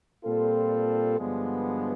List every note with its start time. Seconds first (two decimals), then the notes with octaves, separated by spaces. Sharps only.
0.24 A#2 G3 C4 F4 A4
1.18 G2 D3 F3 G#3 B3